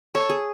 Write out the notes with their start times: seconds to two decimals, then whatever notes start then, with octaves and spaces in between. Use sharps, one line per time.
0.15 A4 C#5
0.29 G#4